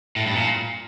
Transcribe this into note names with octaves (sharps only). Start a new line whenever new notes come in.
A2
G2
A#2